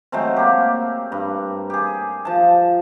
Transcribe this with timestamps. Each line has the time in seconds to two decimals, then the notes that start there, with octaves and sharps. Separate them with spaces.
0.12 F#3 G#3 A3 C4
0.36 A#3 G4
1.12 G2
1.70 G4 G#4
2.25 F3 A5